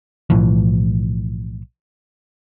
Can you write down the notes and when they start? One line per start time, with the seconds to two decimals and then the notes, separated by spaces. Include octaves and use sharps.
0.30 B1 A2 E3 F3